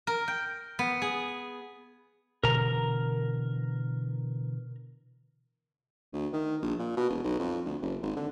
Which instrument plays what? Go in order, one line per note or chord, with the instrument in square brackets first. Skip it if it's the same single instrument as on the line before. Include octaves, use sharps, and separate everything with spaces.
[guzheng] A#4
G5
B3
G#4
[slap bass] B2 D3 E3 [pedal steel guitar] A#4 A#5
[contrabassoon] D2
D#3
A#1
A#2
B2
E1
B1
F2
D2
F#1
G#1
D3